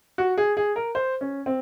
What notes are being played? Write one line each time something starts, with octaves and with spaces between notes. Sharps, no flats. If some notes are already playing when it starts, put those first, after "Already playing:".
F#4
G#4
G#4
A#4
C5
C#4
C4